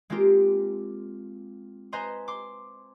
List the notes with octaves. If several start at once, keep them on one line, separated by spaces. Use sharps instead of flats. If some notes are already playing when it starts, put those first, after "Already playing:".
G#3 A#3 C4 F4 G4 A#4
B4 C5 D#5 G#5 A#5 C6
C6 D6